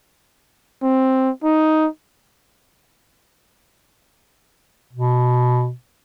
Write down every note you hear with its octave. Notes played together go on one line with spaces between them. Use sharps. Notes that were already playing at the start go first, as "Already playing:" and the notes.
C4
D#4
B2